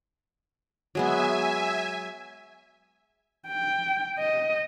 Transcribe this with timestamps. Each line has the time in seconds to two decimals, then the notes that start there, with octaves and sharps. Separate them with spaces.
0.95 F#3 G#3 B3 E5 G#5
3.48 G5
4.19 D#5